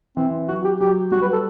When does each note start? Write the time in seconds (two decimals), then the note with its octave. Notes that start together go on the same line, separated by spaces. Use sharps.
0.17 E3 C4
0.48 F#3 F#4
0.64 G4
0.80 F#3 G4
1.12 G3 F#4
1.22 B4
1.33 A4